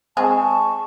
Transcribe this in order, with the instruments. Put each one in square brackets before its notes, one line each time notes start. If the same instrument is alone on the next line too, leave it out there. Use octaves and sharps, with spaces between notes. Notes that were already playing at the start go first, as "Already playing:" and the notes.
[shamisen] G#3 C4 G#4 [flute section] A5 C#6